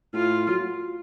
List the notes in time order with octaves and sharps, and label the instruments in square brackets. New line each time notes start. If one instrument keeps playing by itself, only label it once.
[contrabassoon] A2 [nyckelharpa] F4
[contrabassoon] F#3